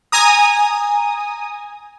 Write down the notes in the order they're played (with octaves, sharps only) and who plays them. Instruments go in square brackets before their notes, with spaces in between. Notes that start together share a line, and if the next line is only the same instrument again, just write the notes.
[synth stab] G#5 A#5 D#6